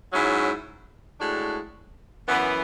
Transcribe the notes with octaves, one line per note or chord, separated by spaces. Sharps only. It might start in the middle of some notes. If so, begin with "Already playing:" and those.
G#2 F#3 C#4 E4
A2 G#3 D4 F#4
F#2 E3 B3